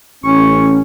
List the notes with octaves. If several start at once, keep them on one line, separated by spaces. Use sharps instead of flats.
A1 C#4 C#6